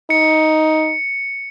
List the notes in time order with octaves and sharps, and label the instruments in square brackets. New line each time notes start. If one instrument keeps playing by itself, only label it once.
[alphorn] D#4 [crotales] C#7